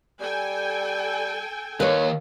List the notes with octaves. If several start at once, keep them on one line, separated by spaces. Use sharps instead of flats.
G3 A4 G5 G#5
D#2 A#3 B4 C#5